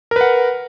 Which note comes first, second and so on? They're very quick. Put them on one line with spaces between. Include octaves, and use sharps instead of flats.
A#4 B4 F#5